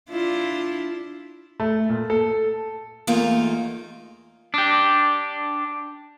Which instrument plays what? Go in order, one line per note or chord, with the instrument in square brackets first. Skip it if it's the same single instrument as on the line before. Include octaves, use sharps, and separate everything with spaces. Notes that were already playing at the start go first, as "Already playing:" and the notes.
[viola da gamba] D4 E4 F4
[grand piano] A3
A#2
A4
[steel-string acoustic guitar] E2 A3 A#3 D#4 F4
[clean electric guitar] D4 G4